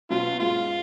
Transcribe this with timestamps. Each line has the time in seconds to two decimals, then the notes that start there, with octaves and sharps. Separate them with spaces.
0.10 B2 F#3 C#4 F4
0.40 G#2 F4